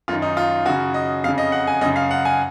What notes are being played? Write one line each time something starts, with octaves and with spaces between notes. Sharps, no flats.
F#2 D#3 F4
D#4
F4
F#2 C#3 F#4
D#5
F2 C#3 F5
D#5
F#5
G#5
F#2 C#3 D#5
F5
F#5
G#5